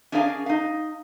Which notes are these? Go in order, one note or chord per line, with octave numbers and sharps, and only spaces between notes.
C#4 D4 G#4 A#4 F5 G#5
D#4 F5